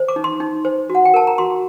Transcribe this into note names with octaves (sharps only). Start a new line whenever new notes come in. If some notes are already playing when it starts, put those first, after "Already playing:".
Already playing: C5
D6
D#4
C6
D#4
C5
F#4
F#5
G5
A#4 A5
A#5
F#4 C6